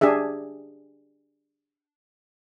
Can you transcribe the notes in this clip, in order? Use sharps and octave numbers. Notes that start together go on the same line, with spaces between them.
D4 G4 G#4 E5